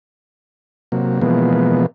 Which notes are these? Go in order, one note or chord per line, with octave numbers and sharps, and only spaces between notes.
C3 F#3 A#3
B2 E3 F3 G#3 A#3 B3